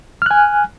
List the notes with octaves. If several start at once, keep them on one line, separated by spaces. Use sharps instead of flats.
G#5 F6 F#6